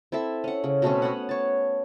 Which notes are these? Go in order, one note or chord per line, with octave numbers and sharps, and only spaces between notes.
C4 E4 A4 E5
C#4 F#5
C#3
B2 A3 C4 C#4
B3 C#4 F#5
C#5 A5